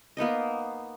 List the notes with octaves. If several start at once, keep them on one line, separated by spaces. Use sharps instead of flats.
A#3 B3 D#4 D#5